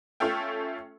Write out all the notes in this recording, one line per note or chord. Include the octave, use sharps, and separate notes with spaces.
A3 C#4 F4 A4 E5 G5